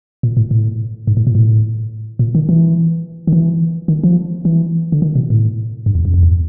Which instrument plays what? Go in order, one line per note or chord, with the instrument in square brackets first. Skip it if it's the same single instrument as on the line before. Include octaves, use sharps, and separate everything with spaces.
[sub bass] A#2
A2
A2
G#2
A2
A#2
A2
A#2
D#3
E3
D#3
E3
D#3
F3
E3
D3
D#3
B2
A2
G2
E2
F#2
F2
E2